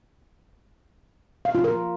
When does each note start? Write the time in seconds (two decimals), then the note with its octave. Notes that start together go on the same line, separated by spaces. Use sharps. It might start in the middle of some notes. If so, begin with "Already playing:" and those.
1.45 F5
1.55 F4
1.64 A#4